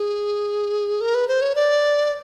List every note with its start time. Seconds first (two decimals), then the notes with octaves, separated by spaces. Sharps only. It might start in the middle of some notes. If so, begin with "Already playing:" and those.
Already playing: G#4
1.01 A#4
1.15 B4
1.28 C5
1.42 C#5
1.55 D5